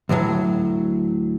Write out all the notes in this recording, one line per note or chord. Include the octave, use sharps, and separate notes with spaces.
D2 A2 E3 F#3